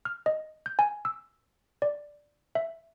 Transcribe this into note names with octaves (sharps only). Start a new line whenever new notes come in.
F6
D#5
G6
G#5
E6
D5
E5